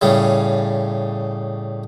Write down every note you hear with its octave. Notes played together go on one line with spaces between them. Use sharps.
A2 C#3 G3